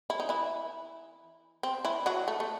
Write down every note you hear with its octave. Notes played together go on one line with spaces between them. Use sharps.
E4
D#4
E3 E4
C4
E3 E4
F#3 F#4
A3
A3